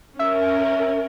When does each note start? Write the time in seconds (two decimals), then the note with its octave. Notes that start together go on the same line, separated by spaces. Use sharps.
0.19 C#4 A#4 E5